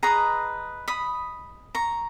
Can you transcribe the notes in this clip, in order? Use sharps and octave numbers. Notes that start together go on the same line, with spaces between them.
G#4 B4 D#5 A#5 C#6
B5 D#6
A#5 C#6